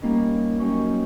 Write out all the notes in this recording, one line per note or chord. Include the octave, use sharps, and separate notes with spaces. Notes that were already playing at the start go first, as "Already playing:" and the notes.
G3 A#3 C#4 D#4
F#2 C#4 D#4 C#5 G5